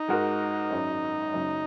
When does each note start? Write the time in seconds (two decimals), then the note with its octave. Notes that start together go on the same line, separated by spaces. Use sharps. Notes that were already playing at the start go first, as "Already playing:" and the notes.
Already playing: D#4
0.08 G#2 G#3 F#4 A#4
0.70 G#1 F#2 F#3 C#4
1.33 F#1 F#2 C#3